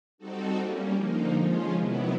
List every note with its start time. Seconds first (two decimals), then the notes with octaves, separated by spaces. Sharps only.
0.18 G3 C4 D#4 F#4 A4
0.56 G3 A#3 C#4
0.94 D3 F3 A#3 D#4
1.34 F3 G#3 C#4 F4
1.72 C3 D#3 F#3 B3 E4